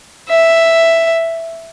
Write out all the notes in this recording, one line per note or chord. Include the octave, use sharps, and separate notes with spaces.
E5